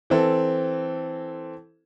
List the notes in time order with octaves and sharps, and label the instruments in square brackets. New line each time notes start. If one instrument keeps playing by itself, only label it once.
[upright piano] E3 C4 A4